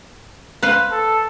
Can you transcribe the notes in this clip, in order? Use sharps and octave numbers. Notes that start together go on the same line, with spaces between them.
B4 C5 F5
A4